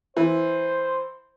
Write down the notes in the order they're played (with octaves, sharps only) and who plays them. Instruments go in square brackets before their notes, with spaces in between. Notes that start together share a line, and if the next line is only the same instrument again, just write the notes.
[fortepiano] E3 [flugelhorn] C5